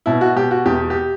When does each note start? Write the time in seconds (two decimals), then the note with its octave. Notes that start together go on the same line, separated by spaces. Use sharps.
0.06 B2 E4
0.21 F#4
0.36 B2 G4
0.51 F#4
0.66 E2 G4
0.90 G4